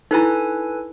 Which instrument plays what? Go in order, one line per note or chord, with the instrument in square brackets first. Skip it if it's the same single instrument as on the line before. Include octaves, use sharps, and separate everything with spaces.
[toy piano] D#4 E4 [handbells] A4 B4 G#5